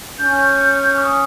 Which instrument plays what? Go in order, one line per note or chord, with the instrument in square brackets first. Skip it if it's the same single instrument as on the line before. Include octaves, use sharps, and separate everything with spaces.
[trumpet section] C#4 [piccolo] G6
[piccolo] C#6
D#6